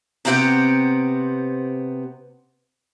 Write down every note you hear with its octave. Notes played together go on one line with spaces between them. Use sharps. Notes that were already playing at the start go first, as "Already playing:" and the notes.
C3 B3 C4 G4 F5 F#5